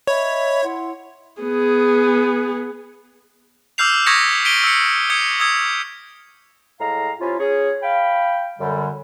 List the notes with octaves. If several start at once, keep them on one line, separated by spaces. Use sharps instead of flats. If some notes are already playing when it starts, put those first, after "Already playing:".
C#5 D#5 E5 B5
E4 F#5 C6
B3 G#4
D6 E6 F6 G6 C7 F7
C#6 D#6 G#6 A#6 B6 C#7
B6 D7 D#7 G7
E6 C#7
D#6 G#6 C#7
D#6 E6 G#6 C#7
A2 G#3 F5 A#5
C3 C#4 E4 F4
C#4 G#4 C#5
F5 G5 B5
F#2 D3 G3